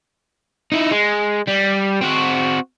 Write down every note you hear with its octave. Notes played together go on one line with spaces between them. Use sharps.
D#4 E4
G#3
G3
C4 F#4